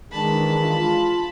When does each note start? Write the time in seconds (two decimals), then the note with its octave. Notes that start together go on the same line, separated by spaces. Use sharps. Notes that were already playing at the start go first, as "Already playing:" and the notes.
0.11 D#3 E3 G#3 D4 A5 B5
0.62 F4